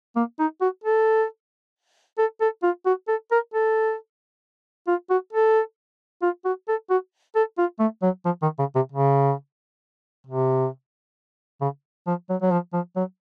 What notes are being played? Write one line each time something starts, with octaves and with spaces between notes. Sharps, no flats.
A#3
D#4
F#4
A4
A4
A4
F4
F#4
A4
A#4
A4
F4
F#4
A4
F4
F#4
A4
F#4
A4
F4
A3
F#3
F3
D#3
C#3
C3
C#3
C3
C#3
F3
F#3
F#3
F3
F3
F#3